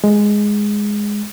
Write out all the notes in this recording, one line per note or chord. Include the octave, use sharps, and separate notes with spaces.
G#3